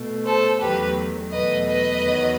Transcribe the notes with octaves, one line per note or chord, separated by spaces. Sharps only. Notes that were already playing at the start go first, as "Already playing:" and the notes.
Already playing: B2 A3
A4 C5
E2 D#3 F#3 A3 G4 B4
E2 B2 F#3 A3 B4 D#5
B4 D#5
E2 D#3 F#3